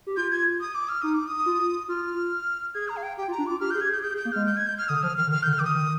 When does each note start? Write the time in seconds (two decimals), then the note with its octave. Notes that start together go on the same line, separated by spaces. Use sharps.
0.07 G4
0.17 F4 G6
0.31 G#6
0.60 D#6
0.75 D6
0.89 F6
1.02 D#4 D#6
1.14 D6
1.27 D#6
1.46 F4
1.88 F4 F6
2.74 G#4 G#6
2.89 A#5
2.97 F5
3.03 G5
3.17 G4 G5
3.28 F4
3.31 A#5
3.38 D4
3.47 F4 D6
3.60 G4 F6
3.71 G#4 G6
3.81 G4 G#6
3.90 G#4
3.92 G6
3.97 G4
4.03 G#4 G6
4.14 G#4
4.17 G6
4.25 A#3
4.32 G#3 F6
4.46 G6
4.57 G#6
4.67 G6
4.78 F6
4.89 D3 D#6
5.03 F3 F6
5.17 D#3 F6
5.27 D3
5.32 D#3 F6
5.43 D3 G6
5.53 F6
5.59 D#3 D6
5.64 D#6
5.75 D#3